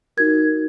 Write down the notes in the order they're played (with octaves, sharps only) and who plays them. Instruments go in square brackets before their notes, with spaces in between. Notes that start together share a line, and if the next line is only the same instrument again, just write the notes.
[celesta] D#4 F#4 A#4 G#6